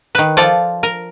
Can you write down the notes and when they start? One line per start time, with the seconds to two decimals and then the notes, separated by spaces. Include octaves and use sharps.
0.15 D#3 B4
0.37 F3 F4 A4 D5
0.83 A#4